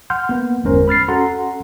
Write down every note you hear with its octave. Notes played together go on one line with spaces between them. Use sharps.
F#5 C6 F6 G6
A#3 B3
G1 E2 G#3 C#4 A#4 C5
B5 F6 A6 C7
C#4 F#4 A4 F#5 A#5 C6